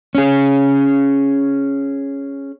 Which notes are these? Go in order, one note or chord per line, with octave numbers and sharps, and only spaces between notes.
C#4 G#4